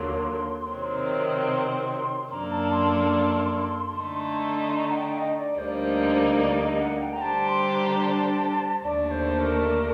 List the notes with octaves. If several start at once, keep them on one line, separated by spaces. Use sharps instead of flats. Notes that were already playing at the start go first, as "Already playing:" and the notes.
Already playing: D#2 D3 F#3 A#3 C6
C3 D#3 F#3 C4
C6
F#2 F#3 A#3 D4 A4 A#5
A5
C6
C6
D3 A3 D#4
C6
A#5
F#5
G5
D#5
D5
D2 D3 G3 A#3 D#4 C5
D5
C5
D5
D#5
F#5
G5
A#5
D3 G3 D4 G4 C5 A5
C6
A#5
A5
D#2 D3 A3 D4 D5
C5
A#4